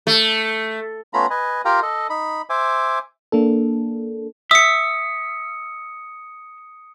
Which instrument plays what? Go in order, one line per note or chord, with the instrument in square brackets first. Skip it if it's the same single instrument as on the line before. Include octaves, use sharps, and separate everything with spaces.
[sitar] A3
[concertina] A3 B3 C#4 F4 A#5 B5
B4 D#5 G#5
F4 G4 A#4 F5 G5 A#5
A4 D#5
D#4 B5
C5 E5 G#5 D6
[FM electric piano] A#3 D4 A4
[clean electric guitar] E5 [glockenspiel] D#6 C#7